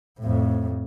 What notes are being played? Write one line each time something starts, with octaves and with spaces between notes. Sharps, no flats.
F2 A2